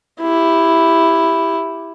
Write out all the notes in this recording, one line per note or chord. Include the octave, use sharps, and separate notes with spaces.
E4 G4